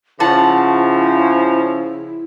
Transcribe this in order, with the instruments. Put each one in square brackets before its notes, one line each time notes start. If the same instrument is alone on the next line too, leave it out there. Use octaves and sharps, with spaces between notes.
[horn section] C#3 F3 [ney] E4 [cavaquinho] F#5 A5